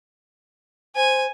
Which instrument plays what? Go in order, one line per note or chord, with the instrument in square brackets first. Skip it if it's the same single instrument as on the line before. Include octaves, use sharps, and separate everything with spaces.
[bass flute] C5 [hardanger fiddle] G#5